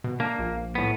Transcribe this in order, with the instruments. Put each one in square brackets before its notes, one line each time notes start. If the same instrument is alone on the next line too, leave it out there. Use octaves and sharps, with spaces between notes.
[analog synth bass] B2
[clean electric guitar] A#3 [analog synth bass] D4
[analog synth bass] A#1
[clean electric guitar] A2 B3